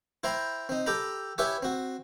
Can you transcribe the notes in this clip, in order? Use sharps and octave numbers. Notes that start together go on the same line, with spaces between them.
E4 C5 G5 A#5 B5
C4 D#4
G4 A4 G5 A#5 B5
E4 G4 B4 C#5 E5 G#5
C4 F#4